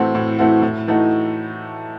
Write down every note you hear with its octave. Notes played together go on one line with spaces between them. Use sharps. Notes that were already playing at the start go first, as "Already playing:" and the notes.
Already playing: A2 E3 A3 C4 F#4
A2
E3 A3 C4 F#4
A2
E3 A3 D#4 F#4